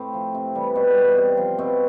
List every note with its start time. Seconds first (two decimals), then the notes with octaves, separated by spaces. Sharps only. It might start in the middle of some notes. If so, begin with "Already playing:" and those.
Already playing: A2 C4
0.14 F3
0.35 C3
0.55 E3 G3
0.76 B2
0.96 G3
1.17 C3
1.37 F3
1.59 B2 C4